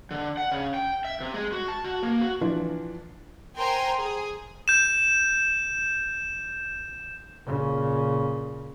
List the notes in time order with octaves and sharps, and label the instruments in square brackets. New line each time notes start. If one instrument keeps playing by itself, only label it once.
[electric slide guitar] D3
F#5
C#3
G5
E5
C3
G#3
F#4
A5
F#4
A#3
F#4
[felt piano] E3 F3 D4 F4
[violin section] A#4 C5 G5 G#5 A#5 C6
G#4
[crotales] G6 E7
[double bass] A#2 C#3